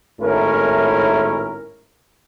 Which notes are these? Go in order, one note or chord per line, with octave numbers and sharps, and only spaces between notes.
G#1 A2 C#4 E4 A#4